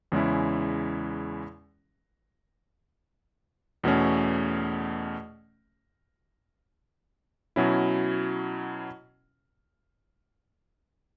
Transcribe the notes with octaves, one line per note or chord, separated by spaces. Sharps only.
E2 C#3 G#3 C#4 E4
E2 B2 A3 C#4
B2 F#3 C#4 E4